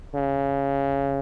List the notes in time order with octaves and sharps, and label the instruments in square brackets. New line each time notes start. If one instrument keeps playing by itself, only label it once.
[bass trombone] C#3